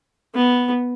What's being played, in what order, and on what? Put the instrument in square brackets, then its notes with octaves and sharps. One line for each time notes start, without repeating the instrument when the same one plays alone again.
[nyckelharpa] B3